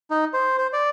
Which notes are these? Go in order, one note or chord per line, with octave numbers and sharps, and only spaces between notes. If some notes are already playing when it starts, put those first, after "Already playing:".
D#4
C5
C5
D5